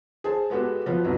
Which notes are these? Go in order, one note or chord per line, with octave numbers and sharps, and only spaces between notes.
G#4 C5 A5
G#3 B3 F#4 G4 A4
B2 F3 B3
G1 C2 F2 B2 E3 F#3